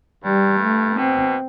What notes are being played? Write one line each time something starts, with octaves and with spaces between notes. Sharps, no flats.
G2 G3
A3
B2 C4